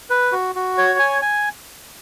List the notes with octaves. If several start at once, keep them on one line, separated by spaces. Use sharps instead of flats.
B4
F#4
F#4
C#5
G#5
G#5